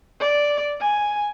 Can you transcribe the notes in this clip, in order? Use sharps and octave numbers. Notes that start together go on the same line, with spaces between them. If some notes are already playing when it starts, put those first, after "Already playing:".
D5
G#5